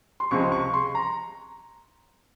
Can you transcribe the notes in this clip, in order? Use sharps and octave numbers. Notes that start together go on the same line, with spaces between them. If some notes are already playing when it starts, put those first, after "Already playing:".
C6
C#2 C3 F3 G#3 C#6
C#6
C6
A#5